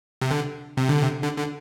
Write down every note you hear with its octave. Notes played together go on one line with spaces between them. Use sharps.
C3
D3
C3
D3
C3
D3
D3